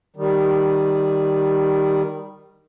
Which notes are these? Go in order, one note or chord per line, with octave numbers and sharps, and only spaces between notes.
D#3 G3